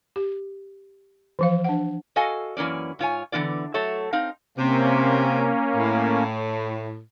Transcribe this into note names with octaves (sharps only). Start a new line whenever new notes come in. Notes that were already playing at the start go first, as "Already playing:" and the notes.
G4
E3 F3 F5
D4 F#5
F#4 A4 D#5 F5 G#5
F#2 E3 A#3 C#4 D5
G#2 F4 C#5 G#5
D3 E3 B3 F4 D5
F#3 A3 A4 C#5 E5
C4 D#4 F5
C3 A#3 C#4
A2